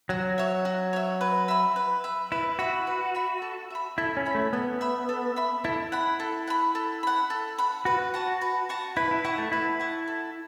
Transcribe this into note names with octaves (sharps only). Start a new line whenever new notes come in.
F#3 F#4
C#5 E5
F#4
C#5 E5
B4
E5 B5
B4
E5 B5
E4 B4
F#4 E5 B5
B4
E5 B5
A4
E5 B5
E4 A4
C#4
E5 B5
A3
B3 A4
E5 B5
A4
E5 B5
E4 A4
F#5 B5
A4
F#5 B5
A4
F#5 B5
A4
F#5 B5
F#4 B4
F#5 A5 C#6
B4
F#5 A5 C#6
E4 B4
E4
E4 F#5 A5 C#6
A3
E4 B4
F#5 A5 C#6
A4